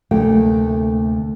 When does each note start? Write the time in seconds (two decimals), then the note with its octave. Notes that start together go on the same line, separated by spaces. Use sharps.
0.11 D2 C3 A3 A#3 G5